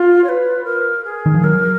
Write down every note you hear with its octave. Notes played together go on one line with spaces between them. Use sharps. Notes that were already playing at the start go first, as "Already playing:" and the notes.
Already playing: F4
C#5
B4
A#4
G#4
D#3
F3
F#3 A#4